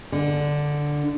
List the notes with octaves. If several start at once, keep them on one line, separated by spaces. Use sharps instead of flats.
D3